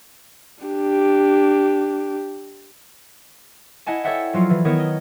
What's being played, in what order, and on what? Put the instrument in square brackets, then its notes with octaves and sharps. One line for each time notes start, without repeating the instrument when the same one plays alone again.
[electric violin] D4 G4
[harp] E4 D#5 F#5 G#5 A5
A4 C#5 D5 E5 F#5 G5
F3 F#3 F4
E3
D#3 B3 E4 A#4 C#5
D#5